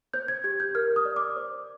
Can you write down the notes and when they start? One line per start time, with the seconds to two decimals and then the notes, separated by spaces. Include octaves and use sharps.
0.14 C5 G6
0.28 G#6
0.44 G4 G#6
0.60 G6
0.75 A#4 F6
0.96 D#6
1.05 D5
1.16 D6
1.36 C5